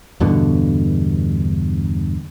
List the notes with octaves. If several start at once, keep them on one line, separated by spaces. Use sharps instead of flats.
E2 G2 B2 D3